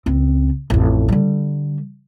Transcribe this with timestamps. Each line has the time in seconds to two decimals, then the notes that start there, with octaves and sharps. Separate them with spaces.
0.06 C#2 C4
0.70 A1 F2
1.08 D3 G3